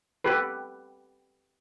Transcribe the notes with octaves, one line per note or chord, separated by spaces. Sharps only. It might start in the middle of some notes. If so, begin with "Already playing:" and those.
G4 A4 B4